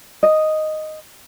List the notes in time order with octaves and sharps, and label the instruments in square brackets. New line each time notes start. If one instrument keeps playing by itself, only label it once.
[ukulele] D#5